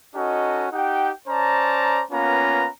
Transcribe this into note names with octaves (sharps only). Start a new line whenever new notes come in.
C#4 D#4 F#4 A4 D#5
D#4 G4 F#5 G5
C#4 C5 D5 A5 A#5
A#3 B3 C#4 F4 B4 A#5